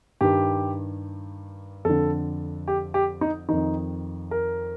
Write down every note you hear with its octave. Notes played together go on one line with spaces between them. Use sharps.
G2 D#3 G4
F2 D3 A4
G4
G4
D#4
F2 D#3 D#4
A#4